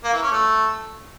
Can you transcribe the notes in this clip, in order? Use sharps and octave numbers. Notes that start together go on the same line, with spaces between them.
A#3
E3
C#4
A3